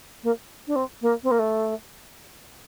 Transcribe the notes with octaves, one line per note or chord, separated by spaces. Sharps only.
A#3
D4
C4
A#3
C4
A#3
A3